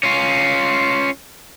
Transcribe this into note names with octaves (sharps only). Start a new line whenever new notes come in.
C#4 F4